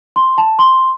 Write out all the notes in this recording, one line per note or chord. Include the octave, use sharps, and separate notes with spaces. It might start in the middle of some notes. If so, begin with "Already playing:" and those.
C6
A5
C6